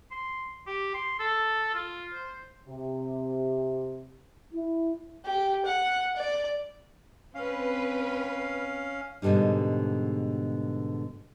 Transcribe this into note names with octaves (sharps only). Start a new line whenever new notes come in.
C6
G4
C6
A4
F4
C5
C3
E4
G4
F#5
D5
C4 C#4 B4 F5
G#2 B2 D3 G3 D#4